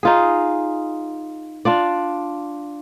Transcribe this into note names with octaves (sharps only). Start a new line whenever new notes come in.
D#4 F4 G#4
D4 F4 D5